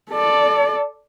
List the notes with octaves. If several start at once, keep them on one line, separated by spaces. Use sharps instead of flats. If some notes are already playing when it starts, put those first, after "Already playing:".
A4 D5